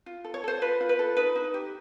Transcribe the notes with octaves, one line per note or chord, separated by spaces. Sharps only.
F4
A4
C#5
A4 C5
F4 B4
F4
B4
A4
D#4 B4
D#4
G4